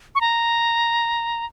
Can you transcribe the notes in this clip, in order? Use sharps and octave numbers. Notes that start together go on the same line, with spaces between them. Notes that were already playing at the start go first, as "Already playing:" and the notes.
C#6
A#5